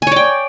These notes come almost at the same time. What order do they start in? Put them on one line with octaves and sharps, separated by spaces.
G#5 C#5 D5 G5